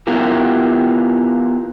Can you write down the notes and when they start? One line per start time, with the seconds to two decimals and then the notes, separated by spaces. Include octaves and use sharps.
0.07 B3 E4 F4 G4 A#4